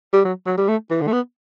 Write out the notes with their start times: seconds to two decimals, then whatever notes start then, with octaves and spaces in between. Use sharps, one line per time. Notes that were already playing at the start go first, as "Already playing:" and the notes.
0.13 G3
0.24 F#3
0.46 F#3
0.58 G3
0.68 A3
0.90 E3
1.01 D3
1.07 A3
1.12 B3